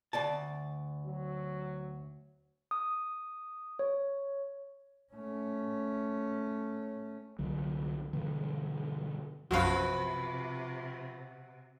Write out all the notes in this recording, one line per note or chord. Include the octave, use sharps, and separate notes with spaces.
D2 D5 A5
F#3
D#6
C#5
A3 C#4
C2 D3 F#3
G2 B2 D3 E3
B1 F#2 C3 F3 F#4 B4 F5